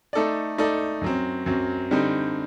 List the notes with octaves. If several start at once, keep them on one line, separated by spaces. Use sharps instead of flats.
A3 D#4 A4 D5
A3 D#4 A4 D5
F#2 F#3 C4
F#2 F#3 C4
D3 G3 C4 D#4